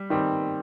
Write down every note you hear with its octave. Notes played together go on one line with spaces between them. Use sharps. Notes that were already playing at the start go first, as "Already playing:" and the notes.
Already playing: G3
D#3 G3 C4